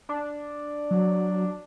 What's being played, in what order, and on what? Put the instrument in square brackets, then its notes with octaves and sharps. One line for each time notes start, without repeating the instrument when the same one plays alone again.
[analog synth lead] D4
[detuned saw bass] F#3